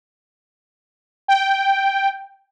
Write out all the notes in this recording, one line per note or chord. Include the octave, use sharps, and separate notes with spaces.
G5